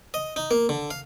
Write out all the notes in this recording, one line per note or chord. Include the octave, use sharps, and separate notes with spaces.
D#5
D#4
A#3
D3
F5